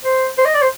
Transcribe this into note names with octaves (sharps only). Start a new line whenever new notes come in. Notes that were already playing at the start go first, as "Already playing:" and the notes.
C5
C5
D#5
D5
C5